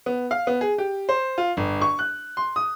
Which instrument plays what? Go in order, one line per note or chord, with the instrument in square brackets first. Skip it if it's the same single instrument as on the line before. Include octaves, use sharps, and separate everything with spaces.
[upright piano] B3
F5
B3
G#4
G4
C5
F4
G1
C#6
F#6
C6
D#6